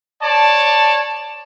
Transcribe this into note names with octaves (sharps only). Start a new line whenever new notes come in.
C#5 D5 A5